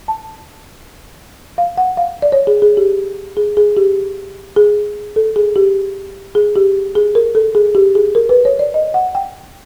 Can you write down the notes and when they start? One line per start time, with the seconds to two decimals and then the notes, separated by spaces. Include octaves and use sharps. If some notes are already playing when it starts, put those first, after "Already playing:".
0.08 A5
1.58 F5
1.77 F#5
1.97 F5
2.22 D5
2.32 C#5
2.47 G#4
2.62 G#4
2.77 G4
3.37 G#4
3.57 G#4
3.77 G4
4.56 G#4
5.16 A4
5.36 G#4
5.56 G4
6.35 G#4
6.56 G4
6.95 G#4
7.15 A#4
7.35 A4
7.55 G#4
7.75 G4
7.95 G#4
8.15 A#4
8.29 B4
8.45 C#5
8.59 D5
8.74 D#5
8.94 F#5
9.15 G5